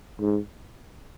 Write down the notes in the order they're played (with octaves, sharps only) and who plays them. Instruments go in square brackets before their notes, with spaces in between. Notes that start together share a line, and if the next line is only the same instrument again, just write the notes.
[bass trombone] G#2